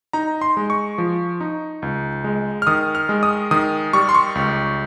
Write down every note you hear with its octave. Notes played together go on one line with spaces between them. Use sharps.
D#4 A#5
C6
G#3
C#6
F3
D#4
C#2
G#3
F6
D#3 D#6
F6
G#3
D#6
D#3 D#6
G3 C#6
C6
C#6
C#2